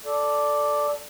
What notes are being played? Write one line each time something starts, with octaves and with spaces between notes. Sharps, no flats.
A4 D5